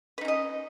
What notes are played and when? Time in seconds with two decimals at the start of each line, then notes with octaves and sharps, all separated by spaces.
0.18 B4
0.21 D#4
0.25 C#4
0.28 D#5